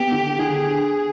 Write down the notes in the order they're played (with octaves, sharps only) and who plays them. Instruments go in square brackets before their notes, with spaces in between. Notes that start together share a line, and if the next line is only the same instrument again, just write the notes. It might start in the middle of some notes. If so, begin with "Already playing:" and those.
Already playing: [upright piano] B3 [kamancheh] G4
[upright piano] D3
[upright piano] D3 [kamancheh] G#4